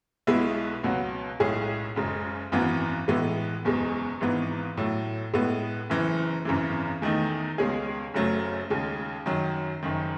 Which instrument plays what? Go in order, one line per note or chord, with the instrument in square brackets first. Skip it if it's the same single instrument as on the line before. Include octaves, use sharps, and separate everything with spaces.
[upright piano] B1 B2 G#3 B3 E4
C#2 B2 F#3 B3 F#4
B1 A2 G#3 C#4 G#4
F#1 F#2 C#3 G#3
G#1 F#2 E3 B3 F#4
A2 E3 G#3 B3
F#1 E2 B2 G#3
G#1 G#2 E3 B3
A2 F#3 A3
A2 G#3 B3
F#1 F#2 E3
G#1 F#2 C#3 E3
E2 D#3 A3 D#4
C#2 B2 G#3 C#4 G#4
F#1 F#2 C#3 F#3 A3
D#2 C#3 G#3
F#2 D#3 F#3
F#1 F#2 D#3